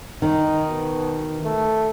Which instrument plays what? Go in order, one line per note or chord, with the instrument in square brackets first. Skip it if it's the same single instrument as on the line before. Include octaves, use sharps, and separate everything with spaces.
[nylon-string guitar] D#3 [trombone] D#4
[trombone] B2
A3